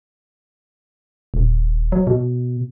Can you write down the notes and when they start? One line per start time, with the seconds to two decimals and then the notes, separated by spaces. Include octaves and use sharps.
1.34 D#1
1.92 F#3
2.07 B2